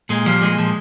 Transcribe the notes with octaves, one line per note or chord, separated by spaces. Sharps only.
A#2 G#3
F3 G3
A#2 G#3
F3